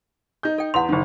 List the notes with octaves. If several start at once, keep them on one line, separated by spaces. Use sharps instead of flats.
D#4 G6
A4 G5
E2 F#5 C6 F7
F#1 D#3